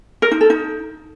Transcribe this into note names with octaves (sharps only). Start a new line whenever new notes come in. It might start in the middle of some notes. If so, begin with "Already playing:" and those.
A#4
D#4
A4
D#4